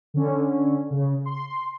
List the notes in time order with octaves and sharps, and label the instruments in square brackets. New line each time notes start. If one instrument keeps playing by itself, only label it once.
[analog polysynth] D3 C#4
C#3
C6